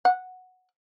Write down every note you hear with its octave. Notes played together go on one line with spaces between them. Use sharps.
F#5